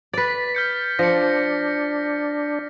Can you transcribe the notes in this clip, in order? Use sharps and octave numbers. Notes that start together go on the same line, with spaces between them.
B4 D5 A6 B6
F6 G6 C#7
F3 D4 A#6 C#7